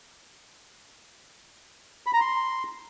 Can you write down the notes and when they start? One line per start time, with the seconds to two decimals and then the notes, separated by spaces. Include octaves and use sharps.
2.06 B5
2.14 A#5
2.21 C6